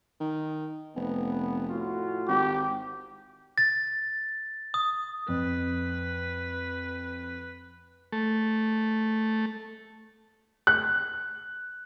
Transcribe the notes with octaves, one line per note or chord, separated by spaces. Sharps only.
D#3
F1 B3
A2 F4 F#4
G#1 G4
A6
D#6
F2 B4
A3
F#6